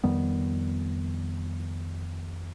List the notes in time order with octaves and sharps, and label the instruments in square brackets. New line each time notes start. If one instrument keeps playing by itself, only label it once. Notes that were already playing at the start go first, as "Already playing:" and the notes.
[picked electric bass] F2 D#3 G3 B3